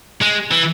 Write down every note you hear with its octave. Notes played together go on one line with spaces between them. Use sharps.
G#3
E3